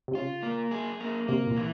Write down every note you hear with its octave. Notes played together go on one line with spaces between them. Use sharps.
C3
C#3 F4
A#3
G#4
A#3
C3 A#3
A#2
E3